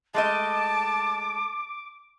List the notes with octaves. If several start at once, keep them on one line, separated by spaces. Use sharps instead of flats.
G#3 A3 D#5 A5 D6